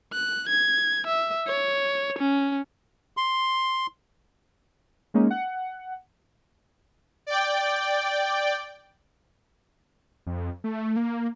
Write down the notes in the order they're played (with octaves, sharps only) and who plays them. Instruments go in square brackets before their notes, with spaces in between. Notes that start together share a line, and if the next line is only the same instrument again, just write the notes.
[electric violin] F#6
G#6
E5
C#5
C#4
[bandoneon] C6
[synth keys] G#3 A#3 C#4 D#4
F#5
[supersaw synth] D5 G5
[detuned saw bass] F2
A3
A#3